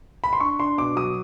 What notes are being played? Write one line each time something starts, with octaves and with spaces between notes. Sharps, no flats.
B5
C6
D4 C#6
D4 C6
B2 D6
F#3 D#6